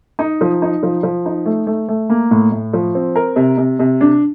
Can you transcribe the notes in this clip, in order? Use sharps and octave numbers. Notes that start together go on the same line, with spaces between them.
D#4
F3
D#4
F3
F3
D#4
A3
A3
A3
A#3
A2
A2
F3
C4
A#4
C3
C3
C3
D4